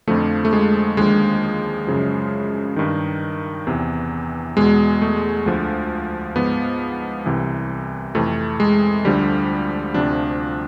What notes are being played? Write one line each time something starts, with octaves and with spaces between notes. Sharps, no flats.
F2 D3 F3 A3
A3
G#3
D#2 D3 F3 G#3
F#2 C#3 F3
G2 D#3
E2 C3 E3
E2 B2 G#3
A3
D2 D3 F3
G#2 F3 B3
C2 C3 E3
F2 C3 E3 A3
G#3
D2 D3 F3 G3
D2 C3 F3 D4